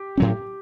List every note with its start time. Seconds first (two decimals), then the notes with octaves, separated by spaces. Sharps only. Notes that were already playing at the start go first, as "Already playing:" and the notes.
Already playing: G4
0.17 A2 F#3 C#4